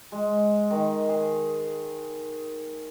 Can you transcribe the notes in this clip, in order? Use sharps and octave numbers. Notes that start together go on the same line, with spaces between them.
G#3
D#3
G#4